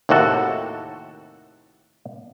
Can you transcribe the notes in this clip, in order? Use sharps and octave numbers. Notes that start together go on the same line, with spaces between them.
D#2 A2 C3 F#4 A4